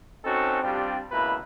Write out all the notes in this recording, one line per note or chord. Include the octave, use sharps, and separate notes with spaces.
C4 C#4 D#4 F#4 A4
G3 C4 D4 F4 G4
C#2 B2 A#3 E4 B4